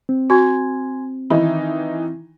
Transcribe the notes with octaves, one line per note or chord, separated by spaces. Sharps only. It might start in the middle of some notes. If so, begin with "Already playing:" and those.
C4
F#4 G#5 C6 G#6
D#3 E3 D#4 B5